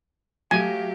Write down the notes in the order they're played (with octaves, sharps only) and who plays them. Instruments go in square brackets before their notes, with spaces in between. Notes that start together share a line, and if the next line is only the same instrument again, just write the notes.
[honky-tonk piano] F#3 A3 [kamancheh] G4 F5 [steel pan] G#5